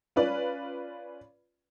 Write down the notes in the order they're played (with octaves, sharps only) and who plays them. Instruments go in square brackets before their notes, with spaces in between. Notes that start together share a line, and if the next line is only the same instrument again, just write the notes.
[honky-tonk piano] C#4 F4 B4 D5